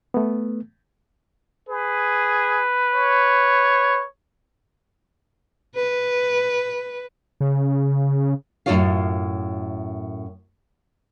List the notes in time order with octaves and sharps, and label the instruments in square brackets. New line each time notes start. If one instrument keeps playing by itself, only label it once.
[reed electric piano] A3 B3
[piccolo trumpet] G#4 [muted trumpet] B4
[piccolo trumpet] C#5
[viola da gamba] B4
[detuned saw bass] C#3
[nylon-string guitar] F#2 A2 C3 F4 C#5 F5